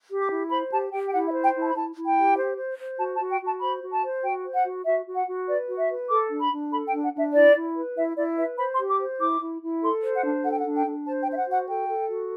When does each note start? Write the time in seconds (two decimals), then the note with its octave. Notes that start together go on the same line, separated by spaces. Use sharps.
0.10 G4
0.20 D6
0.30 E4
0.50 C5 B5
0.71 G4 A5
0.92 G4 G5
1.06 G5
1.12 E4 F#5
1.28 E5
1.33 C5
1.43 G5
1.54 E4
1.59 A5
1.69 B5
1.74 E4 A5
1.95 E4
2.05 G5
2.17 G4
2.37 C5
2.58 C5
2.78 C5
2.99 F#4 A5
3.15 A5
3.20 F#4
3.30 G5
3.41 F#4 A5
3.61 C5 B5
3.82 F#4
3.92 A5
4.03 C5
4.23 F#4 G5
4.43 C5
4.54 F#5
4.64 F#4
4.85 F#4 E5
5.06 F#4
5.16 F#5
5.26 F#4
5.47 B4 D5
5.68 F#4
5.78 E5
5.89 B4
6.09 A4 D6
6.30 D4
6.40 B5
6.51 D4
6.71 A4 B5
6.87 G5
6.92 D4
7.03 F#5
7.13 D4 E5
7.33 E4 D5
7.54 E4
7.75 B4
7.96 E4 E5
8.16 E4 D5
8.37 B4 E5
8.58 C5 B5
8.73 C6
8.78 G4
8.89 D6
8.99 C5
9.20 E4 D6
9.41 E4
9.61 E4
9.82 A4 C6
10.03 C5
10.13 F#5
10.23 D4
10.44 A4 F#5
10.51 G5
10.58 F#5
10.65 D4
10.75 G5
10.85 D4
11.06 C5 A5
11.21 G5
11.26 C5
11.31 E5
11.37 F#5
11.47 F#4 F#5
11.67 A4 G5
11.88 A4
12.09 F#4